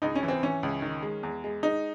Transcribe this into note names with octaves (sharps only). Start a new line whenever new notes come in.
C#2 D#4
C#4
E3
C4
E3 C#4
C#2
D#3
G#3
E2
G#3
G#3 D#4